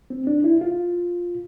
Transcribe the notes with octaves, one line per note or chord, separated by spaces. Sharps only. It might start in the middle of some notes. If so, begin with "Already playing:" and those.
C4
D4
E4
F4